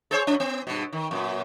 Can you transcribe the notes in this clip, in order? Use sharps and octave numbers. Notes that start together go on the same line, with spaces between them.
G#4 C5 C#5
B2 C#4
B3
G2 B2
D#3
F#2 A#2